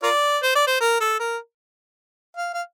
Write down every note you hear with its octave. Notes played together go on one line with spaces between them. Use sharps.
F4 A#4 D5
C5
D5
C5
A#4
A4
A#4
F5
F5